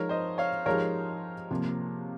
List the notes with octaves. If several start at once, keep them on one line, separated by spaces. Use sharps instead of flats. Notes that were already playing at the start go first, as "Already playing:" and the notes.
Already playing: F3 G#3 D#4 A#4 C#5
C5 D#5
C#5 F5
F3 G#3 D#4 G4 A#4 C#5
C3 F3 A#3